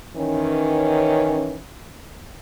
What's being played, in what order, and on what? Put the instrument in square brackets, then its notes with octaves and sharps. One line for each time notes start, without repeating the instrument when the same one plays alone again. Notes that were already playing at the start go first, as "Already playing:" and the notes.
[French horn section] D#3 E3 C#4